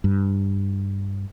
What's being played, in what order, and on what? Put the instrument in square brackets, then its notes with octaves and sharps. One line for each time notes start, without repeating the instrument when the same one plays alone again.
[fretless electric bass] G2